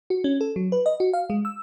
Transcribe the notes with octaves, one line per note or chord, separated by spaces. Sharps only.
F#4
C#4
A4
F#3
B4
D#5
F#4
F5
G#3
E6